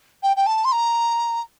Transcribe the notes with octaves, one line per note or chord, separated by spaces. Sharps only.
G5
G5
A5
C6
A#5